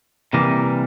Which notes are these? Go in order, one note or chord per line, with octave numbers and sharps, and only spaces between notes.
C3 E3 G3 A#3